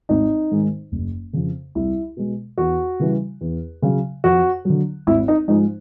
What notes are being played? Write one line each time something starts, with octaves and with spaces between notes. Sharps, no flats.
G#1 D#4
G#2 D#3 G#3
F#1
F2 C#3
C2 E4
B2 G#3
E2 F#4
C#3 E3 G3
E2
C#3 F#3
F2 F#4
D3 F#3
G#1 E4
D#4
G#2 F3 G#3 D#4